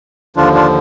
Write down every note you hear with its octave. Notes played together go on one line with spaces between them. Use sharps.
D#2 D3 F3 D4 F4
D4 F4